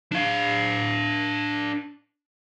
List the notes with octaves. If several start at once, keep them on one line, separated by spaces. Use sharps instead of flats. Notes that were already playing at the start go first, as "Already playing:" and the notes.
D4 F5